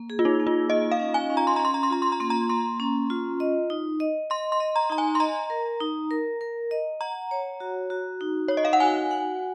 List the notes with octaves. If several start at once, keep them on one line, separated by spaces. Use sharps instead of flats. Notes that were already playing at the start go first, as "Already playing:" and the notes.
Already playing: A#3
G#4
F4
D#4
A#3
F4
F4 D#5
F5
C#4
G#5
C#4
A#5
C6
C#4 A#5
C6
A#5
C6
F4 A#5
C6
A#5
A#3 C6
A#5
A#3 C6
C#4
F4
D#5
D#4
D#5
D#5 C6
C6
D#5
A#5
D#4 A#5
G#5
C6
D#5 A#5
A#4
D#4
A#4
A#4
D#5
F#5 A#5
C#5
F#4
F#4
D#4
D#4 C#5
D#5
F5
F#5
F#4 G#5
F#5